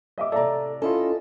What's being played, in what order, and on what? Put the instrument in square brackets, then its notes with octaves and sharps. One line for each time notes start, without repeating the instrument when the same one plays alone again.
[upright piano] D#5 E5 D6
[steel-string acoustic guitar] A2 C3 [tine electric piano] A4 [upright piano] D5 E5 A#5
[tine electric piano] C#4 E4 F4 [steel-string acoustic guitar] A4 D#5